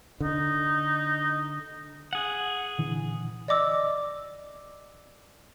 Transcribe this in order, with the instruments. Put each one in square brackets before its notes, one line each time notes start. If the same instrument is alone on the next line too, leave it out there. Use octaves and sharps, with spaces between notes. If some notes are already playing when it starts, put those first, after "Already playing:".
[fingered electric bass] D3 [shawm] D#4
[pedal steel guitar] G#4 F#5
[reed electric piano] A#2 D3 E3
[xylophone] D5 D#5 D6 E6